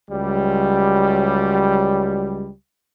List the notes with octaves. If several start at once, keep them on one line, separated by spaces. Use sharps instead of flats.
C#2 F#3 G3